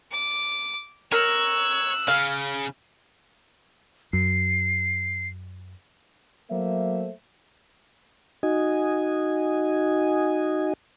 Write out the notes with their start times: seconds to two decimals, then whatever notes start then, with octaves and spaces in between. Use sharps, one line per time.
0.11 D6
1.12 A#4 C#5 E6 F#6
2.08 C#3 F5
4.13 F#2 C7
6.50 F#3 A3 A#3 C5 E5
8.43 D#4 F#4 D#5 G#5